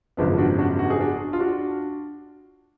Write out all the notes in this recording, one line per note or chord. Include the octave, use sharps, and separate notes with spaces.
G#1 F#2 C#3 F3 B3 D4
D4 F#4
D4 F#4
F#4
G#4
D4 F#4
F4
D4 F#4